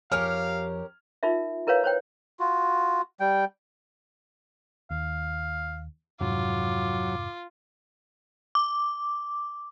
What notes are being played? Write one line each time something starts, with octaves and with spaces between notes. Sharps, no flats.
F2 G4 A#4 C#5 F5 G#5 F6
D#4 F4 A#4 E5
E4 A#4 B4 C#5 F5
C5 C#5 G5
F4 F#4
G3 G5
D#2 F5
F2 G#2 C3 F#3 F4 D6
D6